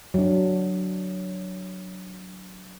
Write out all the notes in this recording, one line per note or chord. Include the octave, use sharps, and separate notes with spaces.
F#3 D4